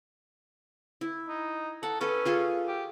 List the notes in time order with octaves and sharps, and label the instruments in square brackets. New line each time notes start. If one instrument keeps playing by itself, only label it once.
[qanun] E4
[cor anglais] D#4
[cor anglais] A4 [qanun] F#5
[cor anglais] C#4 [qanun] A4 B4
[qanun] F4 G#4 A4
[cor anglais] G4